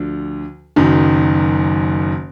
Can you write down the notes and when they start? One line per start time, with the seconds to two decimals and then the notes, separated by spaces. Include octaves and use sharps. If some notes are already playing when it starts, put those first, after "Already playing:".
Already playing: D2 D3 F3
0.76 F#1 F#2 D#3